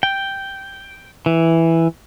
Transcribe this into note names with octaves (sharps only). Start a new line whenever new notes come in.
G5
E3